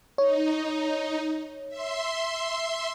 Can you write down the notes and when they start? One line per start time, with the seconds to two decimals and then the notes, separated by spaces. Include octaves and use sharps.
0.18 D#4 C#5
1.68 E5 C6